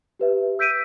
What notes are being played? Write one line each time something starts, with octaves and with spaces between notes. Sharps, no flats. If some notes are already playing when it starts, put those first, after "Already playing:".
G4 B4 E5
E6 G6 B6 D7 D#7